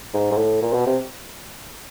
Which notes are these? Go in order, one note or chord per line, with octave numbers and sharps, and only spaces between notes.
G#2
G#2
A2
A#2
B2
C3